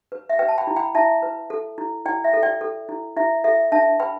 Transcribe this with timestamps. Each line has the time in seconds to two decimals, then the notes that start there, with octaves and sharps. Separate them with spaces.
0.12 B4
0.29 E5
0.39 B4 G5
0.48 A5
0.58 G5 B5
0.67 E4
0.76 G5 B5
0.95 E4 E5 A5
1.23 B4
1.50 A4
1.78 E4
2.06 E4 D5 G5
2.24 E5
2.33 A4
2.43 D5 G5
2.61 A4
2.89 E4
3.17 E4 E5
3.44 A4 E5
3.72 D4 E5 A5
4.00 B4 G5 B5